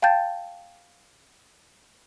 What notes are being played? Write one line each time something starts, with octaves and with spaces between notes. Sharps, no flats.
F5 G5 A5 G6 A6